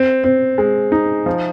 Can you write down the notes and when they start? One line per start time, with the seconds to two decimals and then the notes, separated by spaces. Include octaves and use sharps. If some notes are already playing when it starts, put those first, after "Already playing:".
Already playing: C4
0.24 C4
0.58 G#3
0.92 D#4
1.26 F3